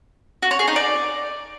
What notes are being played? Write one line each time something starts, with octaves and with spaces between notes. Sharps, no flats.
F#4
C#5
G#4
D#4
D5